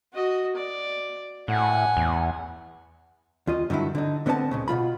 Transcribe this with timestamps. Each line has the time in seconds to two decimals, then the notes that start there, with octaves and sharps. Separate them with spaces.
0.13 F#4 D#5
0.56 D5
1.48 A2 F#5 G#5
1.97 E2
3.47 D#2 F4 D#5
3.70 G2 D3 D#3 F#3 E4
3.95 D3 D#4
4.26 D3 B3 C4 C#5 A5
4.51 C#2 A#2 C#3
4.68 B2 D#3 F4 B5